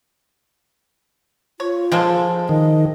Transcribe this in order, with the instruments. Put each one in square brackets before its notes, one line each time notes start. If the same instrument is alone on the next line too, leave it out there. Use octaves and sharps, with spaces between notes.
[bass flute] F4 [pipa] C#5
[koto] F3 G#3 [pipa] A#3 C4 A4
[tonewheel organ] D#3 [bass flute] D#5